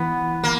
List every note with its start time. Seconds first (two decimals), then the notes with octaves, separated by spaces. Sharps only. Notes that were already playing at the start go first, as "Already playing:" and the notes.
Already playing: E3 B3
0.43 A#3